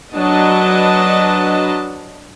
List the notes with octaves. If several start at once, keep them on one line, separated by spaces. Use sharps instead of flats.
F#3 D4 B4 D#5 A5